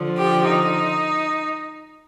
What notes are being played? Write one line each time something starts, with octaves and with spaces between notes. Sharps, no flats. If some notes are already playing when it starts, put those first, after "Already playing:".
Already playing: D3 F3
G4
D#4